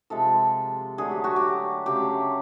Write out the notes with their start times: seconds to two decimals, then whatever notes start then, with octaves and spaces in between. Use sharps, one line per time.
0.10 C3 F3 G#3 A4
0.98 D3 F#3 A3 G#4
1.11 G4
1.24 F#4
1.36 G4
1.86 C#3 F#3 A3 G4